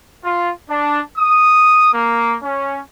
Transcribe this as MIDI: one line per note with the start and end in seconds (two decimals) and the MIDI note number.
0.25 0.52 65
0.70 1.01 62
1.18 1.92 87
1.94 2.37 58
2.43 2.80 61